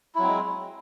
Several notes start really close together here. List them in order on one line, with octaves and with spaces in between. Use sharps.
E4 F#3 C4 G#3